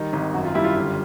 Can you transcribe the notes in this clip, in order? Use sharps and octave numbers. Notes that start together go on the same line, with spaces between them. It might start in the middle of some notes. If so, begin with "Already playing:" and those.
Already playing: D#3 G3
G#1
F#2 F#4
F4
G3 E4
F4
G1 F4